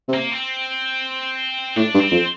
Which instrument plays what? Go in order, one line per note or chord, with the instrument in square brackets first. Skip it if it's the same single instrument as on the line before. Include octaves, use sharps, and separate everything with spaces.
[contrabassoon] C3
[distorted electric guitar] A#3
C4
[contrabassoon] A2 [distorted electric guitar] D4
[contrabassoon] G2
[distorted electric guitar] C4
[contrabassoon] F2